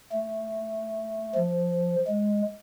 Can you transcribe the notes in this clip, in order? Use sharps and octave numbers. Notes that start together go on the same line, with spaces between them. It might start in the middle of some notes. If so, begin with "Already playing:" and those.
A3
F3
G#3